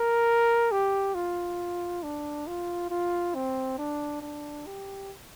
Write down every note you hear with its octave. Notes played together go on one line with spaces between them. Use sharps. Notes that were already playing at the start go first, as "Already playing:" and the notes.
Already playing: A#4
G4
F4
D4
F4
F4
C4
D4
D4
G4